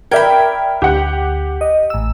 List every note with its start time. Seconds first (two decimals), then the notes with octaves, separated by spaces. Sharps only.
0.11 A#4 D5 E5 G5 B5 G#6
0.82 D2 G4 F#5
1.61 D#5
1.90 A1 E6